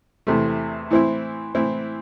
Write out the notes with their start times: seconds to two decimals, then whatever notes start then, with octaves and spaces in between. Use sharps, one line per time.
0.27 E2 C3 A3
0.91 A2 E3 C4 E4
1.55 A2 E3 C4 E4